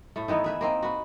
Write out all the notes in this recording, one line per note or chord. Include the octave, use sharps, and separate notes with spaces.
A2 A3
D#3 E3 B3 D#4
G#4 B4 E5
A#3 C4 D#4
F#4 B4